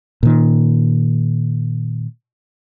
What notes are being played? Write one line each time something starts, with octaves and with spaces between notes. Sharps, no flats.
A#2 D#3